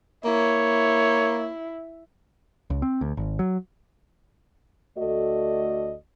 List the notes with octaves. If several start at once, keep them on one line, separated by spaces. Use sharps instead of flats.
A#3 E4 C#5
C#2
C4
D2
G#1
F#3
D2 A3 F#4 A4 D5 D#5